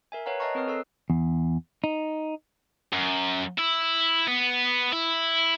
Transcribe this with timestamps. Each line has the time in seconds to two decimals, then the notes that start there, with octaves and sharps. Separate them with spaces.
0.12 A#4 E5 G#5
0.26 B4 C#5 F5 F#5 A#5
0.40 C#5 D#5 F5 A5 A#5 C#6
0.55 C4 A#4 B4 D#6 F6
0.67 A4 A#4 F5 E6
1.10 E2
1.84 D#4
2.93 F#2
3.59 E4
4.28 B3
4.92 E4